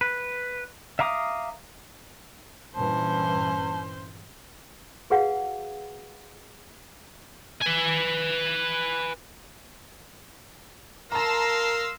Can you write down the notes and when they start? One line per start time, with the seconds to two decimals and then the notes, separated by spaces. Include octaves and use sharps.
0.01 B4
0.99 E5 F5 A#5 D6 D#6
2.75 G2 A#2 E3 C#4 C5 A5
5.10 F#4 G#4 B4 F5 F#5
7.62 B4 G#5
11.12 A#4 F5 A5 A#5 C6 E6 A#6